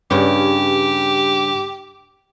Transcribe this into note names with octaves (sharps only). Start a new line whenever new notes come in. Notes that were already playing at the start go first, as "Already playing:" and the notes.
G2 C#3 G4